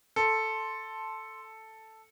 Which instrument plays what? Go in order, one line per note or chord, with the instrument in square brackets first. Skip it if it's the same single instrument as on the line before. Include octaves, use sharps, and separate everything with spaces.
[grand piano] A4 [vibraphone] A5 C6 [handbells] C#7